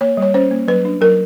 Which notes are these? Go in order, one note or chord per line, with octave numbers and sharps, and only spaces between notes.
A#3 C#5
G3 C#5
C#4 C5
A#3
F#3 B4
D4
F#3 A#4